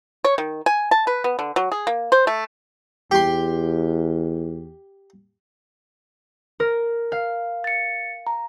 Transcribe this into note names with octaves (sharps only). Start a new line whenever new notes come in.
C#5
D#3
G#5
A5
B4
B3
D3
F#3
G#4
A#3
C5
A3
E2 G4 C6
A#4
F5
A6 C#7
A#5